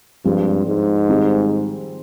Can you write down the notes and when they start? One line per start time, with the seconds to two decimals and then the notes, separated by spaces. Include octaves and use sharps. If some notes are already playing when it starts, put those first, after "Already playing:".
0.25 G2 F3 G#3 C4 F4
0.67 G#2
1.08 D#3 G3 C4 D#4